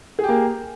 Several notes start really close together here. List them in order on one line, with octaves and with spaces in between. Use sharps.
G#4 G4 A#3